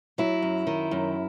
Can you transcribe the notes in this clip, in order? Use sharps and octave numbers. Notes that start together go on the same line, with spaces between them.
F#3 E4
F#2
D#3
F#2